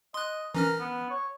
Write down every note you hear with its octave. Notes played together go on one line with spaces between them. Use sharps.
D#5 C6 F#6
E3 C#4 A#4 F6
B3
C#5